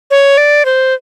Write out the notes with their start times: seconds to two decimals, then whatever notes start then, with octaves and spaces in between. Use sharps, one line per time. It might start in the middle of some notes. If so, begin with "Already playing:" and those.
0.11 C#5
0.37 D5
0.65 C5